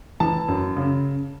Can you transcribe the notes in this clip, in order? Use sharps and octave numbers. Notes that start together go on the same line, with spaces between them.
E3 A5
F#2
C#3